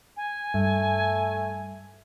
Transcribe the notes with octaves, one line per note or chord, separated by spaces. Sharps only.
G#5
G2 A3